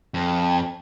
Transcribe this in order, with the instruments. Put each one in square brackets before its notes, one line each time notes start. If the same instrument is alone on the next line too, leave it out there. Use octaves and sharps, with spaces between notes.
[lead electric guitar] F2